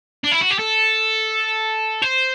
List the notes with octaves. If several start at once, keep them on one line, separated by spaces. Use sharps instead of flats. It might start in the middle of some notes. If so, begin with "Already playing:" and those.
D4
E4
F#4
G4
A4
C5